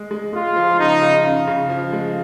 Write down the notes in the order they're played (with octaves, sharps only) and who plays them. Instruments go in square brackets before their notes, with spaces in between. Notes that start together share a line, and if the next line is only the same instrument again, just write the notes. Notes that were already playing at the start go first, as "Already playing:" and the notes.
Already playing: [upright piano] G#3
G#3
[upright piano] G#3 [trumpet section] F4
[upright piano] F3
[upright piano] C#3 [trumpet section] D#4
[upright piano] C#3
C#3
C#3
F3
G#3